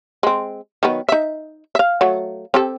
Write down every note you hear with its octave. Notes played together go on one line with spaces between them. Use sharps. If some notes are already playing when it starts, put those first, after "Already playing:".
G#3 C4
D#3 F#3 B3
D#4 E5
E5 F5
F#3 A3
C4 G4 A4